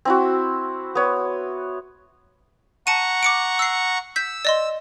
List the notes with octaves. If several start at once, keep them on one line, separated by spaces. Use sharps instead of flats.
C4 E4 F#4
B3 C#5
F#5 A5 A#5 C#6 C#7 D#7
D6 C#7 D7
E6 C7
E6 G6 B6
D5 D#5 C6